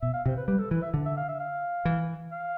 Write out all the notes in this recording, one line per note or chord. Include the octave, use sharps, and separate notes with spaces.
B2 E5
F5
C3
C5
B4
G3 B4
A4
E3 B4
E5
D3
E5
F5
E5
F5
E3
F5